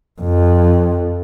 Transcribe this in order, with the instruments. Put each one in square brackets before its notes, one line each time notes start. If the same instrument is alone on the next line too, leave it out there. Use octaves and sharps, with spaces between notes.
[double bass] F2